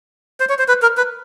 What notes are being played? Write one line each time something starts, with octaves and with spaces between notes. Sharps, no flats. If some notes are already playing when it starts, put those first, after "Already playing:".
C5
C#5
C5
B4
A#4
B4